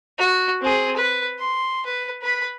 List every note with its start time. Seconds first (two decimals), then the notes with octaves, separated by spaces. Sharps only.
0.19 F#4
0.62 C4 G#4
0.97 B4
1.39 C6
1.86 B4
2.22 B4 B5